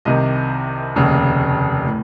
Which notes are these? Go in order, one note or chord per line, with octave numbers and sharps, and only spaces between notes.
C2 C3 D#3 D#5
F1 D#2 C#3
A2